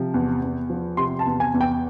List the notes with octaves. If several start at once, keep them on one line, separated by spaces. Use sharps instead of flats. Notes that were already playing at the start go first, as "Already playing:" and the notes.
Already playing: C3 F3
E2
E2
F3
C3 C6
A5
E2
G#5
E2
G5